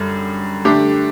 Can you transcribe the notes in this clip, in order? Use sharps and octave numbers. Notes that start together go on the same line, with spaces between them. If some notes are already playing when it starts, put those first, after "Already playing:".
Already playing: F#2 D3 G3
D3 A3 D4 G4